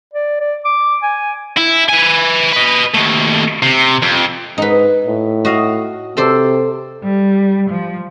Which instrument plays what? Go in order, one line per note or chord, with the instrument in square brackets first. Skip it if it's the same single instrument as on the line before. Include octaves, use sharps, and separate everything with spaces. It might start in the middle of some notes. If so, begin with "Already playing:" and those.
[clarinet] D5
D5
D6
G#5
[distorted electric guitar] E4
B4 G#5
B4 D#5
D#2 A3
C3
F2
[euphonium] G#2 [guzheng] D#4 B4
[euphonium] A2
[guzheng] F#4 D#5 F5
[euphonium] C3 [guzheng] A4 C5 D5
[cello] G3
F3